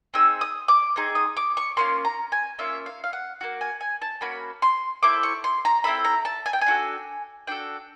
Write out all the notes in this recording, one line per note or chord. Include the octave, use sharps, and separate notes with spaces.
C4 D#4 G#4 E6
D#6
D6
C4 D#4 G#4
D#6
D6
C#6
A#3 C#4 F4 C6
A#5
G#5
A#3 C#4 F4 E5
F5
F5
F#5
A#3 C#4 F#4
G#5
G#5
A5
A#3 C#4 F#4 B5
C6
C4 E4 A4 D6
C#6
C6
A#5
C4 E4 A4 B5
A#5
A5
G#5
G5
G#5
D4 F#4 A4
D4 F#4 A4 G5